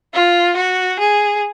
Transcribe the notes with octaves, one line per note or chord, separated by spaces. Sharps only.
F4
F#4
G#4